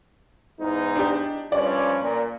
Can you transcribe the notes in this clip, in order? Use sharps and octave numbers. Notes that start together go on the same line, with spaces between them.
E2 G#2 D#4
D4 G4
G2 F3 C#4 D5
A#2